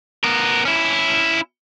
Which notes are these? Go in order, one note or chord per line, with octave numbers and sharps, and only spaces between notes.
B3 A#4
C#4 E4